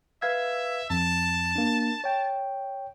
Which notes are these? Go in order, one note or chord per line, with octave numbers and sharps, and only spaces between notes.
B4 E5 F5 G#6
F2 A5
A#3 D4
C#5 G5